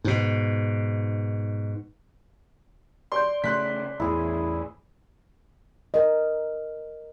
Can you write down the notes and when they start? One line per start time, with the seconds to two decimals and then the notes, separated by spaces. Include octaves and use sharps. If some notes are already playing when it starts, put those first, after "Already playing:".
0.04 G#2 B2
3.12 D5 C6 G6
3.44 C#3 A3 C6 F#6 B6
4.00 A1 E2 E4 G#4
5.94 A#4 D#5